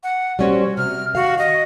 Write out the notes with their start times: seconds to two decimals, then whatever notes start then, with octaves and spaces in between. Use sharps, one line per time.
0.03 F#5
0.39 G3 C#4 F#4 C5
0.77 C3 F6
1.15 D#3 F#4 F5
1.39 D#5